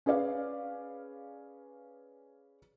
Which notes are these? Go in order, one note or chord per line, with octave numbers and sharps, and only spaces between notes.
C#4 G#4 B4 D5 F5